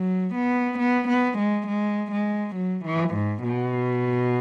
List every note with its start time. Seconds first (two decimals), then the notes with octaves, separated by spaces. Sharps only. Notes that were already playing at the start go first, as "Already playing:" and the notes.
Already playing: F#3
0.35 B3
0.79 B3
1.09 B3
1.38 G#3
1.68 G#3
2.12 G#3
2.55 F#3
2.85 E3
3.15 G#2
3.44 B2